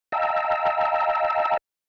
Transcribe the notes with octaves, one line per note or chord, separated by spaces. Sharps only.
D#5 F5 G5 A5 A#5 E6